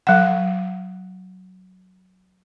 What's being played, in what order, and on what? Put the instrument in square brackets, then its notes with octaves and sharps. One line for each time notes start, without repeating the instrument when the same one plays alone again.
[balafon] F#3 F#5